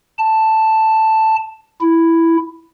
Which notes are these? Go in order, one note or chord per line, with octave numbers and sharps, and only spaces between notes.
A5
E4